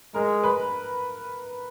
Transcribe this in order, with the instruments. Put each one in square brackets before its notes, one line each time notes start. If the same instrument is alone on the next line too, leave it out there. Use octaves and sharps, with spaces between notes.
[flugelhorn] G#3 [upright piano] A#4
[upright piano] B4